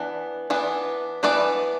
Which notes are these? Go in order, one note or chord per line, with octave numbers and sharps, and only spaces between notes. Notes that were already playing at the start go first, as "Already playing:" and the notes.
Already playing: E3 B3 D4
E3 B3 D4
E3 B3 D4 B4 D5